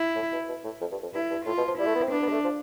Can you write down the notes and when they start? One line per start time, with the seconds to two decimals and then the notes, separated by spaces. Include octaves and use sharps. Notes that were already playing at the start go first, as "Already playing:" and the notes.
Already playing: E4
0.16 A2
0.32 B2
0.48 B2
0.64 A2
0.81 F2
0.91 G2
1.03 F2
1.13 G2 E4
1.30 G2
1.46 A2 F4
1.57 B2
1.68 F3
1.79 G3 E4
1.87 A3
1.95 B3
2.03 C4
2.11 B3 D4
2.22 B3
2.29 G3
2.33 A3
2.44 F3